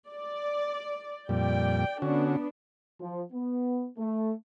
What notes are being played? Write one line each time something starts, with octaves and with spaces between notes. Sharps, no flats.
D5
F2 A#2 G3 D5 G5
D3 B3 C#4 D4 F#4
F3
B3
A3